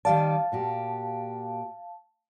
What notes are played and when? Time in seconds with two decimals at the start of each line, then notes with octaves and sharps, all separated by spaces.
0.05 D#3 G3 D5 F5 A5
0.52 A#2 F#4 G4